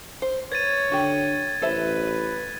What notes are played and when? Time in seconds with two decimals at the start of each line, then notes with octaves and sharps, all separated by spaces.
0.22 C5
0.52 B4 C#5 G#6 A6 D#7
0.92 D3 F#4 G4
1.62 A1 A4 B4 C5 E5